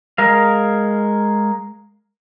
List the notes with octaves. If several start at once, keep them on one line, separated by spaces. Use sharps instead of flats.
G#3 A#4 F5